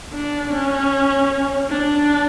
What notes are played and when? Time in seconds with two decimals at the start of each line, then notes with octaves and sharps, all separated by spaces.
0.13 D4
0.52 C#4
1.69 D4